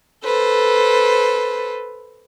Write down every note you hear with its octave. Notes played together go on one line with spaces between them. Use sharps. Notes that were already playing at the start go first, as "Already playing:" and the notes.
A4 B4 C5